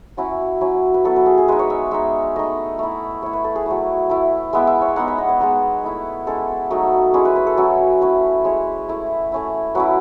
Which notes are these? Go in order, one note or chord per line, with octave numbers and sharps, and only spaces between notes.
F#3 C#4 E4 F#4
F#3 C#4 E4
B4
F#3 B3 E4 A4
B4
G#4
G#4
G#3 D#4 B4
C#5
E5
G#3 D#4 E5
A3 D#4 D#5
A3 E4
A3 E4 C#5
B4
A4
G#4
F#3 A3 E4
A3 E4
G#3 B3 E4 E5
E5
C#5
G#3 B3 D#4 F#5
E5
D#5
C#5
G#3 B3 D#4 B4
A3 E4
G#3 C#4 E4 A4
F#3 A3 D#4
G#3 C#4 E4 G#4
B4
B4
A4
F#3 C#4 E4
A3 C#4 E4 B4
G#3 C#4 E4 C#5
A3 E4
A3 C#4 E4
F#3 C#4 E4 B4